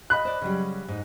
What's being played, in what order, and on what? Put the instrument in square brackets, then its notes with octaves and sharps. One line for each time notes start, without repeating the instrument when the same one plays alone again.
[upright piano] D#5 B5 F#6
[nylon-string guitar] C5 D5
C#3 F#3 G3
G#2 D#4